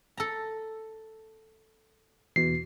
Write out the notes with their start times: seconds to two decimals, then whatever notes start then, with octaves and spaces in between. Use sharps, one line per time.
0.17 A4 A#5
2.36 E2 B2 C7